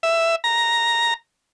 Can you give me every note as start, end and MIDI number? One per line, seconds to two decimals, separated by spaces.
0.03 0.35 76
0.44 1.14 82